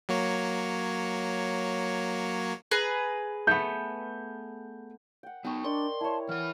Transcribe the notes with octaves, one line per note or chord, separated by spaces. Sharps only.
F#3 A#3 C#5
G#4 B4 A#5
A3 B3 G6
F#5 G5
B3 D#4 G5 C#6
D4 A#4 D5 D#5 C6
E4 C#5 A5
E3 B4 F#5 F6